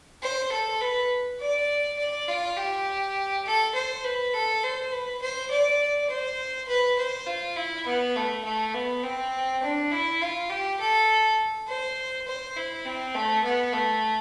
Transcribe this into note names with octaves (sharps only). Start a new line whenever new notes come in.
C5
A4
B4
D5
D5
F4
G4
A4
C5
B4
A4
C5
B4
C5
D5
C5
B4
C5
F4
E4
B3
A3
A3
B3
C4
D4
E4
F4
G4
A4
C5
C5
E4
C4
A3
B3
A3